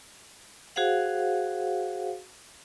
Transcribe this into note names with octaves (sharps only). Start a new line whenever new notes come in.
F#4 G#4 C5 F5 F#5